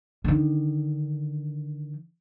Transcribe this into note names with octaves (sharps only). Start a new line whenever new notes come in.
D3 D#3